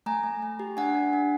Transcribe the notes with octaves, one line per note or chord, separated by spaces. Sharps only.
A3 G#5 A#5
A3
A3
G4
D4 F#5 G#5
D4
D4